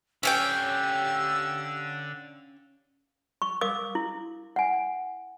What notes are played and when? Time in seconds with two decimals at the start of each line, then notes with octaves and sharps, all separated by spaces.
0.23 D3 C#4 G4 C#5 F5 G5 E6
3.42 C#6
3.61 A#4 F5 D6 D#6
3.95 E4
4.56 F#5 G#5